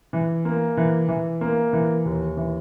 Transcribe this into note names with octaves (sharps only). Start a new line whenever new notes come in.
E3
A#3
E3
E3
A#3
E3
D#2
E3